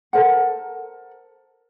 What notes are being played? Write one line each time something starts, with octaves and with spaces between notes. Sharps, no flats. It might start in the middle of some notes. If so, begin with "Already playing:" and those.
A4 A#4 C5 F#5